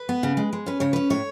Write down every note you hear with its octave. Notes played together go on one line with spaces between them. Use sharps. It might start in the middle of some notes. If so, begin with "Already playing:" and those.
Already playing: B4
B3
C#3
G#3
G#3
C#4 B4
C#3 C#5
C#4 B4
A2 C#5